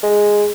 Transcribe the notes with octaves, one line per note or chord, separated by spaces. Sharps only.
G#3